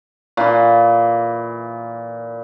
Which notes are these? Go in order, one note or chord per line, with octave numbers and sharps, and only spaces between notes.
A#2 E3